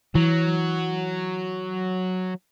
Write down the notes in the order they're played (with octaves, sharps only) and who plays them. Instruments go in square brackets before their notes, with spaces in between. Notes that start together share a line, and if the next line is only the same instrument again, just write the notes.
[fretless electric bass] E3 [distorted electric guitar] F#3